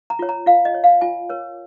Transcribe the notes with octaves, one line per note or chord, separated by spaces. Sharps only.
A#5
F4 C#5
A#5
F4 F5
D#5
C#5
F5
F4 G#5
A#4 C#5